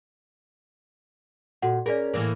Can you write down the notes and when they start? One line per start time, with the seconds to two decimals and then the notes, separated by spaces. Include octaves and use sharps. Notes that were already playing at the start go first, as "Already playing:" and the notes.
1.62 A#2 F#4 A4 F#5
1.86 C#4 G#4 A#4 D5
2.14 A2 E3 A#3